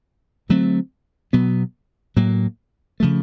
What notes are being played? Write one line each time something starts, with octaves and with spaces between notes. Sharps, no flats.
D3 F#3 A3 C4
B2 F#3 B3
A2 F#3 A#3
C#3 F3 A3